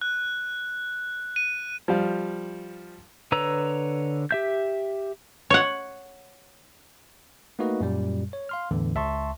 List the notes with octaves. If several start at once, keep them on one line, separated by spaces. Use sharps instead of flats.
F#6
D#7
F3 G3 F5
D3 B4 C#5 A#5 E6
G4 E5 G6
C#5 F#5
A3 A#3 D#4 F#4 B4 D#5
F#2 A#2 G3
C#5
F5 C6 F6
E2 A2 D3 E3
C#2 E5 A5 C6 C#6